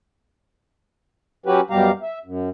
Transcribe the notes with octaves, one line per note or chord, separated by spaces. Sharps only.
F#3 C#4 F#4 G4 B4
F#2 B2 G3 G4 F5 A#5
E5
F#2